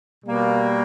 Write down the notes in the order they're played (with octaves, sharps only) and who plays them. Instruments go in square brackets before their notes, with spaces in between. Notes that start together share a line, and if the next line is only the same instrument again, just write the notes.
[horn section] B2 G3 A#3